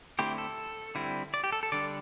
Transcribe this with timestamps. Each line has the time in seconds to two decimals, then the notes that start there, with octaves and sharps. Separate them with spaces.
0.19 D3 A3 C4 E4 G4
0.38 A4
0.95 D3 G3 C4 E4
1.34 D5
1.44 G4
1.52 A4
1.63 A4
1.72 D3 G3 D4 D5